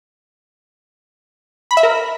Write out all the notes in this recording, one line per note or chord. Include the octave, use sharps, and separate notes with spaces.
B5
E5
A#4